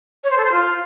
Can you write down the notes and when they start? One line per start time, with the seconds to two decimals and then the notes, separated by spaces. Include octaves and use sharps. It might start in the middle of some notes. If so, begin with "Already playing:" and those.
0.24 C#5
0.31 C5
0.38 A4
0.45 C5
0.52 F4